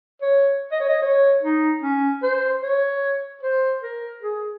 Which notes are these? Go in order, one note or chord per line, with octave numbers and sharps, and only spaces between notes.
C#5
D#5
C#5
D#5
C#5
D#4
C#4
C5
C#5
C5
A#4
G#4